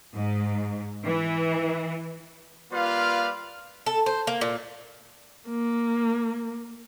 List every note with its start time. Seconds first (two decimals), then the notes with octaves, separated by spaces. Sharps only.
0.15 G#2
1.04 E3
2.72 G3 A#3 F4 B4 D5 F5
3.86 A4
4.06 C5
4.27 A#3
4.41 A#2
5.49 A#3